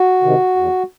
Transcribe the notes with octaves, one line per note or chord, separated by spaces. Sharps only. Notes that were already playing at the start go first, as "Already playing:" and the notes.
Already playing: F#4
C3 D#3
E2